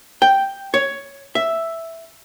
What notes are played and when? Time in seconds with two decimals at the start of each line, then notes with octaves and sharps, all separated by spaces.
0.22 G5
0.74 C#5
1.35 E5